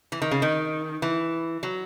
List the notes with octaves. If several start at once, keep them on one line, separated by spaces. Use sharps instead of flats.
E3
D#3
C#3
D#3
E3
F#3